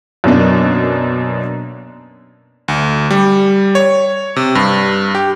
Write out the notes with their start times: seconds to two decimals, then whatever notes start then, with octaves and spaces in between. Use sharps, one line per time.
0.24 F#2 B2 A#3 D4
2.68 D2
3.11 G3
3.75 C#5
4.36 C3
4.55 G2
5.15 G4